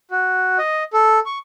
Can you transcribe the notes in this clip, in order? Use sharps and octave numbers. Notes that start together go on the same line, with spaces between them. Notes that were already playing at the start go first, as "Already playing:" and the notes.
F#4
D#5
A4
C#6